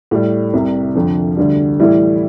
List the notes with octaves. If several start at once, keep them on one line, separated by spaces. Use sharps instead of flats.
A2 G3
C2 C3 G3
F2 D3 F3
D2 D3 G3
A2 E3 G3 E4